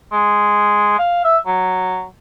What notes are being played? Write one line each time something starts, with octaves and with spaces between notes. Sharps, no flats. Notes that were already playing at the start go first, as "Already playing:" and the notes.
G#3
F5
E5
F#3